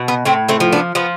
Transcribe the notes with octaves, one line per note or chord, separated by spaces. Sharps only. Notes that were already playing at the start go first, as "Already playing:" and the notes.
Already playing: B2
B3
A2 A3 C4
A3 C4
F3
B3 D4
F3 B3